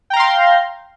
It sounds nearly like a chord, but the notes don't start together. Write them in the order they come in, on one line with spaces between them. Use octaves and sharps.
G5 A#5 F5 C6